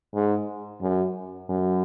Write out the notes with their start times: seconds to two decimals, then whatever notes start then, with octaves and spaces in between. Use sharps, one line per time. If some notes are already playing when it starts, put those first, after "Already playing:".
0.14 G#2
0.81 F#2
1.49 F#2